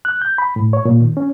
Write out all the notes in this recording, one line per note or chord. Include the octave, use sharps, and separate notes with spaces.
F#6
G6
B5
A2
C#5
A#2
D#3
C#4